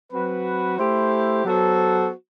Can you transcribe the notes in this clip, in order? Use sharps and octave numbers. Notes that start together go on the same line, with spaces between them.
F#3 C4 F#4 B4
A3 E4 G4 C5
F#3 B3 F#4 A4 C5